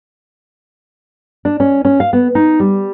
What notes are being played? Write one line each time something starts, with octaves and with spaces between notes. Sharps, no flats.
D4
C#4
C#4
F5
B3
D#4
G3